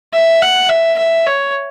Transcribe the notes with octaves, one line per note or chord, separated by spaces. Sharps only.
E5
F#5
E5
E5
C#5